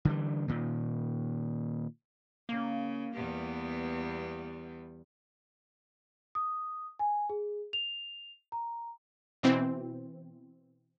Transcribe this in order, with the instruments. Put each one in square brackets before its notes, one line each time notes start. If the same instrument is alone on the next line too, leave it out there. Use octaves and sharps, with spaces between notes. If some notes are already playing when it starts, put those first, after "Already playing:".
[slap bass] D3 E3 G3
A#2 D#3
[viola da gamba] C#3 [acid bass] A#3
[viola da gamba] E2 G3 B3
[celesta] D#6
G#5
G#4
F7
A#5
[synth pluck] B2 E3 C4